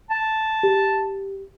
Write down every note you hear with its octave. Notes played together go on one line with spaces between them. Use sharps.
A5
G4